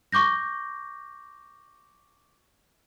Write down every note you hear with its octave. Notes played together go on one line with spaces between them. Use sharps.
C#6 D6 G6 A#6